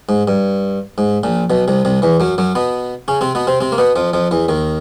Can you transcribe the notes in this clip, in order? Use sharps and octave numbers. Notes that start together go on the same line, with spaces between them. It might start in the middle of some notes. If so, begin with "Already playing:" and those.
G#2
G2
G#2
A#1 A#2
B1 B2
C2 C3
C2 C3
E2 E3
F#2 F#3
F#2 F#3
B2 B3
C#3 C#4
C3 C4
B2 B3
C3 C4
C3 C4
A#3
B2 B3
F2 F3
F2 F3
E2 E3
D#2 D#3